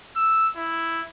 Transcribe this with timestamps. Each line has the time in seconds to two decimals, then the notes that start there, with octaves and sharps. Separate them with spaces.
0.16 E6
0.57 E4